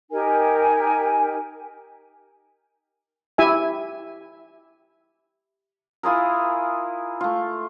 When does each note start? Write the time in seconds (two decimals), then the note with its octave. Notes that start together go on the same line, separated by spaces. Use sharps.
0.12 D#4 G4 A#4 G#5
3.38 E4 G4 E5 G#5
6.03 E4 F4 G#4 A#4
7.21 A3 F4